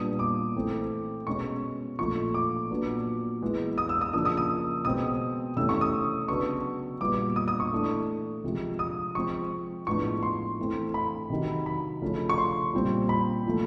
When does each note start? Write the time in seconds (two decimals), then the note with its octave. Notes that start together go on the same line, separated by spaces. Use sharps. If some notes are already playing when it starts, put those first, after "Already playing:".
Already playing: A#2 G3 B3 D4 D#6
0.19 D6
0.55 E3 A3 C4
1.27 B2 G#3 C#4 C#6
1.99 A#2 F3 A3 C#6
2.34 D6
2.70 A#2 F#3 B3 D4
3.42 E3 G#3 B3
3.78 D#6
3.89 E6
4.01 D#6
4.13 C#3 F3 A#3 D4 D#6
4.25 D#6
4.37 D#6
4.85 B2 G#3 C4 D#6
5.56 C3 E3 A3 C#4 E6
5.69 C#6
5.81 D#6
6.28 C#3 F#3 B3 D4 C#6
7.00 A#2 G3 B3 D6
7.36 D#6
7.48 D#6
7.60 C#6
7.72 E3 A3 D4
8.44 C3 F3 G#3
8.79 D#6
9.15 F3 G#3 C4 C#6
9.87 A2 F3 G#3 B3 D4 C#6
10.23 C6
10.59 E3 A3 C4
10.94 B5
11.30 C3 D#3 F#3
11.66 B5
12.02 C#3 F3 A3 C#4
12.29 C#6
12.38 C6
12.74 A#2 G3 C4
13.09 B5
13.46 A#2 F3 A3